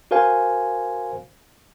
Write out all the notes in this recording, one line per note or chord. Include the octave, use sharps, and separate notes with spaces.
F#4 A#4 C5 F5 G#5